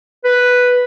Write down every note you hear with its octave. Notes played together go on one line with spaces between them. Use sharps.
B4